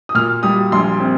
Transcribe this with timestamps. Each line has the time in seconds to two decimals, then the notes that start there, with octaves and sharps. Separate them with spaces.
0.09 D#6
0.15 A#2 F6
0.43 G3 D#6
0.72 A#1 C6
1.00 C4